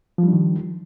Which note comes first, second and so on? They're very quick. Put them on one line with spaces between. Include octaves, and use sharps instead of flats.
F3 G3 D4 D#3